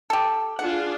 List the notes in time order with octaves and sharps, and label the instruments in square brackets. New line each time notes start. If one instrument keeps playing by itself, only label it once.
[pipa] G4 A4
[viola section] D4 F4 G#4 [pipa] F#5